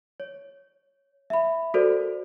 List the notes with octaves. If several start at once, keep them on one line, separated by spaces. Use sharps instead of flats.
C#5
E5 B5
F#4 A4 A#4 C5 D5